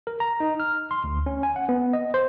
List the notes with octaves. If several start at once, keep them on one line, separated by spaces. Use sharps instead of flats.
A#4
A#5
D#4
F6
C6
D2
C#4
G#5
F#5
B3
D#5
C5